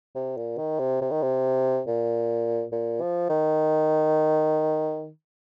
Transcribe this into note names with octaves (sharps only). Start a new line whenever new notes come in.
C3
A#2
D#3
C3
C3
D#3
C3
A#2
A#2
F3
D#3